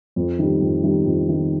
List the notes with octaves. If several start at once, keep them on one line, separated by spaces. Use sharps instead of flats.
F2
D#3 G3
F2
D#3 G3
F2
D#3 G3